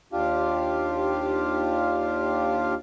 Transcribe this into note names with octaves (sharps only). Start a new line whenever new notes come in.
D#2 D4 F4 G4 F5